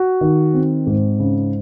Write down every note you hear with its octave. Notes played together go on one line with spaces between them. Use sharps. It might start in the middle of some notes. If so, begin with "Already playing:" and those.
Already playing: F#4
D#3
C4
G#2
C#3